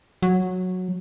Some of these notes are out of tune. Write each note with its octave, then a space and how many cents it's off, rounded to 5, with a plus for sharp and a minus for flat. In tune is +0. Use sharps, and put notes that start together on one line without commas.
F#3 -10